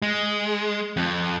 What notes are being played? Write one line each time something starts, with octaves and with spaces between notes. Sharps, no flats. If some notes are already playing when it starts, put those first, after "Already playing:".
G#3
F2